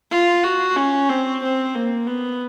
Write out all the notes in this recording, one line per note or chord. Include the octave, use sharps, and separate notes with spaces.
F4
F#4
C#4
C4
C4
A#3
B3